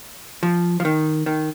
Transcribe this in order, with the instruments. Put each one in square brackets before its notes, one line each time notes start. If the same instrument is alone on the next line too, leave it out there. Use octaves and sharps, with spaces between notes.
[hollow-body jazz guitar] F3
F3
D#3
D#3